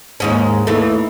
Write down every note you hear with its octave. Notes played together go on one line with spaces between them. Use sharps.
D#2 G#2 C#4
D#2 E3 A3